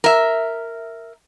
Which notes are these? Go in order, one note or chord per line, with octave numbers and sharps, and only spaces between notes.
A#4 E5